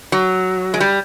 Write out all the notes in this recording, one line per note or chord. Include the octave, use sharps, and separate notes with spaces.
F#3
G#3
G3